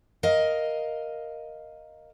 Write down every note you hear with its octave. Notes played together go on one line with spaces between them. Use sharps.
A#4 D#5 F5